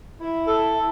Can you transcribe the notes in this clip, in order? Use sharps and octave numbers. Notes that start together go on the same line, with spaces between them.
E4
A4
E4